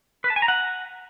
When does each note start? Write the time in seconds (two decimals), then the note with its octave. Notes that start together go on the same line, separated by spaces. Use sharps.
0.24 B4
0.30 A5
0.36 G#5
0.42 A#5
0.48 F#5